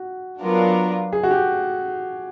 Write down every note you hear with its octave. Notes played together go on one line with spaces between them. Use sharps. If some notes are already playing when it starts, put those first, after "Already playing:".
Already playing: F#4
F#3 B3 D4 F4 A#4
G#4
F#4
G4